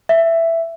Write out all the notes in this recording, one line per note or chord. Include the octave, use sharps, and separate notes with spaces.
E5